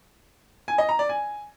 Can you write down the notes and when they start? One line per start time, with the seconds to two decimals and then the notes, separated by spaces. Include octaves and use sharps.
0.68 G#5
0.78 D#5
0.89 A#5
0.99 D5
1.09 G#5